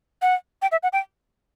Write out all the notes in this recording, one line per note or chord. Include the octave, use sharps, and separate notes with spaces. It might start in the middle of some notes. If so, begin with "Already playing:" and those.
F#5
G5
E5
F#5
G5